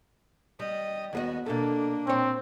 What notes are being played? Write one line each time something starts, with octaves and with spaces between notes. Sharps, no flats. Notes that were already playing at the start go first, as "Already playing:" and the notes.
G3 D#5
D#2 B3 F#4 G#4 D#5
B2 A#3 D4 A4
A#2 C4 C#5